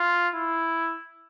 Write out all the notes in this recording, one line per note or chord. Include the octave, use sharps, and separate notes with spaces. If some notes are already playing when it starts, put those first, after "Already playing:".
Already playing: F4
E4